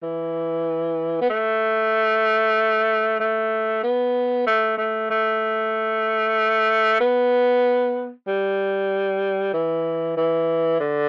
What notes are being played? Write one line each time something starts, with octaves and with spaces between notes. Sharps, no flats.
E3
B3
A3
A3
B3
A3
A3
A3
B3
G3
E3
E3
D3